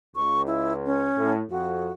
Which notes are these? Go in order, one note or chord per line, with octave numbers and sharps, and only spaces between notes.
C#2 C#6
E4
C#4
A2
F2 F#4